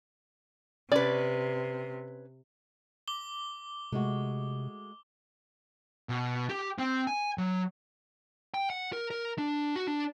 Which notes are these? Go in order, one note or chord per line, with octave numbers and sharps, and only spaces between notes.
C3 C#4 B4 D5
D6 G7
C3 G#3 A3 F#4
B2
G4
C4
G#5
F#3
G5
F#5
A#4
A#4
D4
F#4
D4